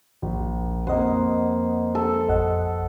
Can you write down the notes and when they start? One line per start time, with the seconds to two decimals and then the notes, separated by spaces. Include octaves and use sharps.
0.22 A#1
0.87 F2 A#3 C5 D#5 F#5
1.95 A4
2.29 A1 F2 D#5 F#5